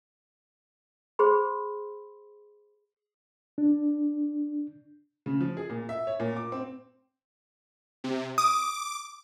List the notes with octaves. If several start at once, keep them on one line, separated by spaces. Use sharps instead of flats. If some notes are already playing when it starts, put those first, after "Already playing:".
G#4 C5 B5 C6
D4
C#3
F3
G#4
A#2
E5
C#5
A#2
D6
C4
C3
D6 D#6